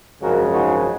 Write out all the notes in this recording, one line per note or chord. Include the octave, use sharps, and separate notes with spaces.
G#1 F#2 C#3 F3 G#3 F#4 A#4
D#4 F#4